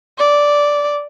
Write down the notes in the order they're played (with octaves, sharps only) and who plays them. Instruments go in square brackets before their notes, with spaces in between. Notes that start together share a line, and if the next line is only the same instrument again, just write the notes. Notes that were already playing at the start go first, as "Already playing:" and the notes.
[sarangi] D5